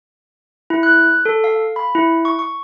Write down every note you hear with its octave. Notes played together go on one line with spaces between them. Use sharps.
E4
F#6
A4
F5
B5
E4
C#6
C#6